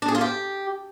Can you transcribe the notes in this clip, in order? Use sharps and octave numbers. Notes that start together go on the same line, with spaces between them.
D4
G#4
F4
G4